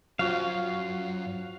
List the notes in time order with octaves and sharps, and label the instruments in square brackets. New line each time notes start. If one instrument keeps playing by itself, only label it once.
[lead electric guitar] F#2 [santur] F3 F#4 C#5 [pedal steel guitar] F5